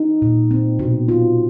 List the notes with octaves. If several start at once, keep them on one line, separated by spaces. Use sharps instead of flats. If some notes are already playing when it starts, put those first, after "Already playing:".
Already playing: D#4
A#2
C4
B2
F4